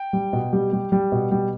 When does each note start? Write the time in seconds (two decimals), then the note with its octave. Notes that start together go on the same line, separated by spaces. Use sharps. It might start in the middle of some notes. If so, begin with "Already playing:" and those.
Already playing: G5
0.13 G3
0.33 B2
0.53 G3
0.73 G3
0.92 G3
1.12 B2
1.31 G3